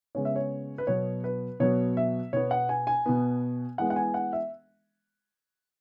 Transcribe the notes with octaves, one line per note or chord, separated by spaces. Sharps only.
C#3 G#3 B3 C#5
E5
C#5
B4
B2 F#3 B3 C#5
B4
B2 F#3 B3 C#5
E5
B2 B3 C#5
F#5
G#5
G#5
B2 B3
E3 G#3 B3 F#5
F#5
G#5
F#5
E5